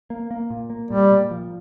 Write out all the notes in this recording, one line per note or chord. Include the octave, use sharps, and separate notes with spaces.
A#3
A#3
A#2
A#3
A#2 G3
A#2
F3